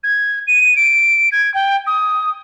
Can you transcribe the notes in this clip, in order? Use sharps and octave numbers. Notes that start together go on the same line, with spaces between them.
G#6
D#7
D7
G#6
G5
D#6